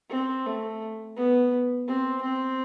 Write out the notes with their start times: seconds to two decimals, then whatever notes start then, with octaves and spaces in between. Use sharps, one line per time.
0.10 C4
0.46 A3
1.17 B3
1.88 C4
2.23 C4